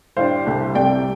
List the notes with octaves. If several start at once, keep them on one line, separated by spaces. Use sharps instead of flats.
A2 G3 D4 C5 F5
C2 C3 A3
C2 C3 A3 D5 G5